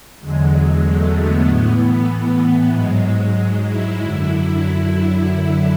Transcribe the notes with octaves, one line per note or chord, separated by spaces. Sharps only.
E2 D3 F#3 G#3
F#3
A3
B3
A2 E3
G#2 F#3 G#3
G#3
E4
F#2 D3 F#3 E4
F#2 D3 F#3